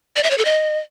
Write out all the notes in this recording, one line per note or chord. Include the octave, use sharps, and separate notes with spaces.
D5
E5
C#5
A4
D#5